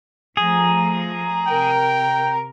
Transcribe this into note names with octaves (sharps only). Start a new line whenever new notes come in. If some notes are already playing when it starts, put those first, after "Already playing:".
F3 A3 G#4 A#5
C3 A#4 G5